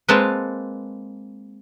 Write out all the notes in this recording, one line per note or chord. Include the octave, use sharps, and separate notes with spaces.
G#3 A#3 C4 B4 C#5 A5